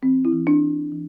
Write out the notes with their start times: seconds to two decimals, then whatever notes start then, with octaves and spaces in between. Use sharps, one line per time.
0.02 E3 C4
0.25 E4
0.32 E3
0.47 D4
0.63 E3
0.92 E3